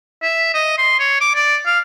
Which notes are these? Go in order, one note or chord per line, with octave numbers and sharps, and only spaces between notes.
E5
D#5
C6
C#5
D6
D5
F5